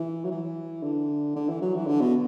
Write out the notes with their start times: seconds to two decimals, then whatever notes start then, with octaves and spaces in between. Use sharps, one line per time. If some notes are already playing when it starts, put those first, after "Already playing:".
Already playing: E3
0.25 F#3
0.31 E3
0.83 D3
1.36 D3
1.49 E3
1.62 F#3
1.75 E3
1.87 D3
2.01 B2